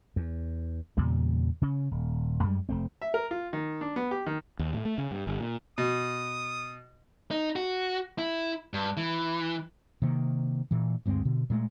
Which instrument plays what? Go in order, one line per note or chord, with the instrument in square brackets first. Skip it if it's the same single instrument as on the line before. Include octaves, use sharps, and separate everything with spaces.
[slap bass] E2
E2 A#2 C#3 G3
C#3 C#4
D#1
F#2 G3 G#3
F1 A3 C4
[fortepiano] E5
A#4
F4
D#3
D4
B3
G4
D#3
[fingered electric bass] D#2
A2
A3
C#3
G2
G1
A#2
[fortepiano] B2 [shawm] D#6
[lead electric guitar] D#4
F#4
E4
G2
E3
[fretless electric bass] C3 D#3 A#3
A#2 E3
D2 G2 G#3 C4
B2 D3
A#2 G#3 A3